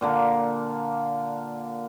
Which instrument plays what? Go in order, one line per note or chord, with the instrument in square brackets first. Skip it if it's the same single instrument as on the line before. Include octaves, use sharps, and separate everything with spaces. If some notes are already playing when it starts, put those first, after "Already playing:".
[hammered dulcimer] A#2 D3 A#3